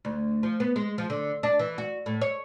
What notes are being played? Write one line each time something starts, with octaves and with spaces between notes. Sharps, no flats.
D2
F3
B3
G#3
F3
D3
D4
E3
F#4
A2
C#5